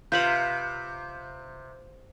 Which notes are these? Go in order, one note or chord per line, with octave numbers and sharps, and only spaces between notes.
C3 F4 B4 B5 G6